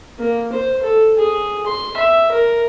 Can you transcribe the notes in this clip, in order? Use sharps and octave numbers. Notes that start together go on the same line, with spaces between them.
A#3
C5
A4
G#4
C6
E5
A#4